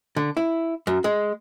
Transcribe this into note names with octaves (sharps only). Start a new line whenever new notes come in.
D3
E4
F#2
G#3